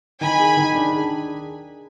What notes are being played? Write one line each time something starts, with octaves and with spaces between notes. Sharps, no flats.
D#3 G#5 B5
G#4
D#3
D4
G#4